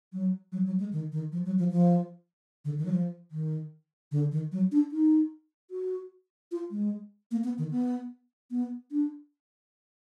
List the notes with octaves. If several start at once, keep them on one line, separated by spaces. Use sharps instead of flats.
F#3
F#3
F#3
G#3
D#3
D#3
F3
F#3
F3
F3
D3
D#3
F#3
F3
D#3
D3
D#3
F#3
D4
D#4
F#4
F4
G#3
A#3
B3
D#3
B3
B3
D4